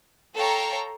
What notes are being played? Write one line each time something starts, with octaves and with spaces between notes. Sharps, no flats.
A4 C#5 F5 G5 A#5